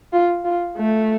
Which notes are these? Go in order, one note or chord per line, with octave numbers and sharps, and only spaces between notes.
F4
F4
A3